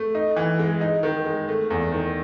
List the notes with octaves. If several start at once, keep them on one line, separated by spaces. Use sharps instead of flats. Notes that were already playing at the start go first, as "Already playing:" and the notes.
Already playing: A3
D#4
E3
G#3
D#4
D#3
G#3
A3
E2
D#3